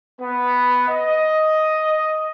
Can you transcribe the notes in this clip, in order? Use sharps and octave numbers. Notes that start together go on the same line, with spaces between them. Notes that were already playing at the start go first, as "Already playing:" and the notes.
B3
D#5